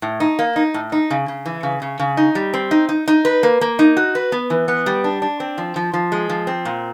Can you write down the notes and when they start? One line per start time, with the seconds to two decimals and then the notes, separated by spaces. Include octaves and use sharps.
0.02 A2
0.20 D#4
0.39 A#3
0.56 D#4
0.74 A2
0.92 D#4
1.10 C#3
1.28 C#3
1.46 E3
1.63 C#3
1.82 C#3
1.99 C#3
2.17 D#4
2.35 G3
2.54 C4
2.71 D#4
2.89 D#4
3.08 D#4
3.25 B4
3.43 A#3
3.61 A#3
3.79 D#4
3.97 F#4
4.15 B4
4.32 B3
4.50 E3
4.68 B3
4.86 G3
5.04 D4
5.22 D4
5.40 C4
5.58 F3
5.76 F3
5.93 F3
6.12 G#3
6.29 F3
6.47 C4
6.65 A#2